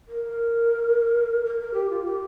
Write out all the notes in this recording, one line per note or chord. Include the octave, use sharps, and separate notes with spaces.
A#4
A#4
A#4
G4
F4
G4